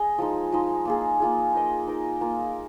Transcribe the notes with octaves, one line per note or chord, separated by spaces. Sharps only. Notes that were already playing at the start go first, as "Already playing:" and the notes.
Already playing: G#4 D#5
F3 G#3 D#4
F3 G#3 D#4
A#3 F4 G#4
A#3 F4 G#4
D#4 A#4 D#5
D#4 A#4 D#5
A#3 F4 A#4